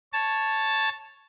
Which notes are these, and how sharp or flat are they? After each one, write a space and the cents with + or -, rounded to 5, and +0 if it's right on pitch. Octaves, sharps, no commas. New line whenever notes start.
C#5 +0 A5 +0